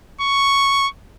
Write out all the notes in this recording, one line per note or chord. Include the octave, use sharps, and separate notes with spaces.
C#6